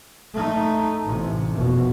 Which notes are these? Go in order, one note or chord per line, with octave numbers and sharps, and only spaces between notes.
A3 D#4
A1 C3
F1 B2